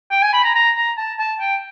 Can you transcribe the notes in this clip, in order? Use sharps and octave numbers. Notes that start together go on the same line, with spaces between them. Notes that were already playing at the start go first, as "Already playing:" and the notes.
G5
G#5
B5
A#5
A#5
A#5
A5
A5
G5